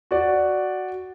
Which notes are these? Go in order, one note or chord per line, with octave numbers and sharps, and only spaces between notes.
F#4 D5